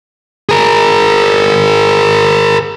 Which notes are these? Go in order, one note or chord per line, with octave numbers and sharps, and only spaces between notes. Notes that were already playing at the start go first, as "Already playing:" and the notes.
G#4 A#4